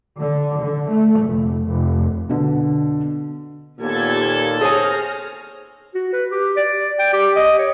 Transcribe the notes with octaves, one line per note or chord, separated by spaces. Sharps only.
D3
D3
A3
F1
F1
B2 D3
D#2 A#2 B3 G4 A4 G#6
G#4 C5 C#5 G#5 F6 A#6
F#4
B4
G4
D5
G5
G4
D#5
C#5